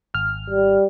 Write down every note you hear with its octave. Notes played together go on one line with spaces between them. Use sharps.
G#1 F6
G3